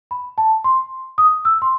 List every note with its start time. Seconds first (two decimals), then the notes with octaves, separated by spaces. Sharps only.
0.11 B5
0.38 A5
0.64 C6
1.18 D#6
1.45 E6
1.62 C6